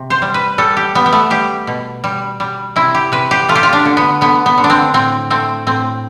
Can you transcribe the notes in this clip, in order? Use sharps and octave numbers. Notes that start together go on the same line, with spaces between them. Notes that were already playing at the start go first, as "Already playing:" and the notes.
Already playing: C3
C5
G3
B4
G3 A4
G4
G3 B3
B3
A3
G3 G4
B2
G3
G3
C3 E4
G4
C3 B4
G4
A3 F4
G4
F4
D4
D3
B3
D3 B3
B3
D3
D4
C4
A2 C4
A3 C4
A2 C4